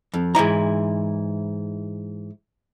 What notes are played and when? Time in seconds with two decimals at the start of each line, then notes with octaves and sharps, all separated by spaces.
0.14 F2
0.35 G#2 E3 E4 A#5